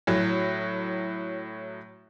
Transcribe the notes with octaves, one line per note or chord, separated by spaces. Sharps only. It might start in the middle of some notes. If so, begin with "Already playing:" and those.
A2 F#3